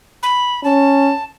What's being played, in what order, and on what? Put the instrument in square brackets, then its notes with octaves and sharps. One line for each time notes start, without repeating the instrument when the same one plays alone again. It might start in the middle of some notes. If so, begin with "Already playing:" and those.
[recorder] B5
[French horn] C#4 [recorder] A5